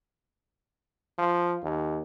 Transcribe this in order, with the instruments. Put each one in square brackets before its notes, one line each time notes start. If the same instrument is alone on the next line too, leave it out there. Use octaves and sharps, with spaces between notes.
[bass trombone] F3
D#2